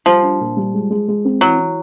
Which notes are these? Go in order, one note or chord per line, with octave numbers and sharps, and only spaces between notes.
F3 G3
D4
A#2
G3
G#3
G#3
G#3
C4
E3 F#3
E3